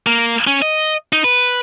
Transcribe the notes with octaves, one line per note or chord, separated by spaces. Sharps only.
A#3
C#4
D#5
D#4
B4